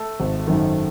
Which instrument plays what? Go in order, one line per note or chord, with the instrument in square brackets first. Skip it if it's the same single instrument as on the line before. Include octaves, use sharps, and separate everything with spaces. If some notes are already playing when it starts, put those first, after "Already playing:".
Already playing: [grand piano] A3 A4
G#1
F#2 D#3